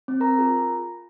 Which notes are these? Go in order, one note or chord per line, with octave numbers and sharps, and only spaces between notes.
C4
A#4 A#5
F4 G#4